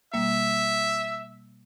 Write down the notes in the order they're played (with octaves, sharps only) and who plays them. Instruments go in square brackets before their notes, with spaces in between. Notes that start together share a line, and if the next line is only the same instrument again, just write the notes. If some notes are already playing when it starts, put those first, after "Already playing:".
[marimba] B2 G3 A#3 [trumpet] E5